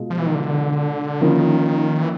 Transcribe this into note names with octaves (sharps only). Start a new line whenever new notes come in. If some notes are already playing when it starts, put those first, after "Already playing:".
Already playing: B2 G#3 F4
F3
E3
D#3
D3
D#3 F3 A#3 C#4 E4
E3